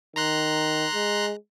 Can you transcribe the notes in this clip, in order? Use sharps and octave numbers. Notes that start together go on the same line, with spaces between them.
D#3 A#5 C6 F#6
G#3